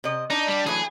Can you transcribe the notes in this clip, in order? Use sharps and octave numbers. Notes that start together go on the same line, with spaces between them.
C3 D#5
D4 D#4
G3
E3 F#3 A3 G#4